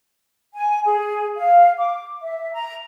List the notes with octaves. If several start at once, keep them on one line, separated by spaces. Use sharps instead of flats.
G#5
G#4
F5
D6
E5
A#5